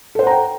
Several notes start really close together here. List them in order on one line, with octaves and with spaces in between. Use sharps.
A4 C5 F#5 A#5 G5